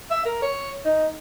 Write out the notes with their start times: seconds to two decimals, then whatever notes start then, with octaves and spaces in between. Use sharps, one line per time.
0.11 E5
0.25 A#4
0.42 C#5
0.85 D#4